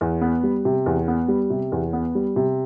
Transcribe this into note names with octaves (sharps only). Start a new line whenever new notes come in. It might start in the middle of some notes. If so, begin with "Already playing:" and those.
E2
B3
G3
C3
E2
B3
G3
C3
E2
B3
G3
C3